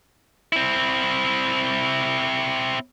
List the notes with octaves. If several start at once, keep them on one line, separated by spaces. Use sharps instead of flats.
C4 E4